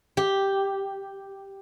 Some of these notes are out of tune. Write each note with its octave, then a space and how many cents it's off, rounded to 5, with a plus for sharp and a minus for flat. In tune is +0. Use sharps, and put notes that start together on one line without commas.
G4 +0